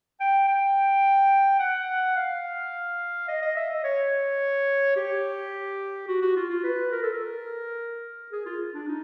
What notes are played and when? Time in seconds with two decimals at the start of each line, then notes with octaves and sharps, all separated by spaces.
0.20 G5
0.48 G5
1.60 F#5
2.16 F5
3.28 D#5
3.42 D#5
3.56 E5
3.70 D#5
3.84 C#5
4.96 G4
6.08 F#4
6.22 F#4
6.36 F4
6.49 F4
6.64 B4
6.92 A#4
7.03 A4
7.13 A#4
8.32 G#4
8.46 F4
8.74 D4
8.88 D#4